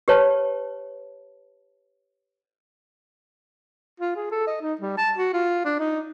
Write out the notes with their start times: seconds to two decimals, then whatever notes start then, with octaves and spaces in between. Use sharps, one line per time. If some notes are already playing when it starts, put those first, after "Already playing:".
0.08 G4 B4 C#5 A5
4.00 F4
4.16 G#4
4.31 A4
4.47 D#5
4.61 D#4
4.81 G3
4.98 A5
5.17 F#4
5.33 F4
5.65 D4
5.79 D#4